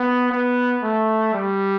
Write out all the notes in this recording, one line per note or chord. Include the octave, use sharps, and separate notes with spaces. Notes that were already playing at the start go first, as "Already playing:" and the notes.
Already playing: B3
B3
A3
G3